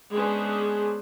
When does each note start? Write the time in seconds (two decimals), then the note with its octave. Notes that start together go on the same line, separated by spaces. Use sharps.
0.13 G#3 B3 C#4 D4 G#4 C5